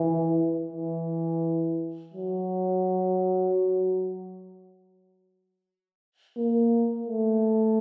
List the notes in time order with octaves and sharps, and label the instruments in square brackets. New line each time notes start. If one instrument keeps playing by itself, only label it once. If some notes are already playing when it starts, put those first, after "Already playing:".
Already playing: [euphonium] E3
E3
F#3
A#3
A3